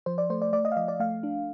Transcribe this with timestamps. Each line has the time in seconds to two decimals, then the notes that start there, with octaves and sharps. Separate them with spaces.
0.06 F3 C5
0.18 D5
0.30 A3 C5
0.42 D5
0.53 A3 D5
0.65 D#5
0.72 F5
0.77 F3 D#5
0.88 D5
1.00 A3 F5
1.23 D4